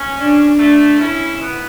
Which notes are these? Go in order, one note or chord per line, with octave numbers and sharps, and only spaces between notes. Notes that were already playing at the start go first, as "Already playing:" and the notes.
Already playing: C#4
D4
A3 D4
C#4 E4
B3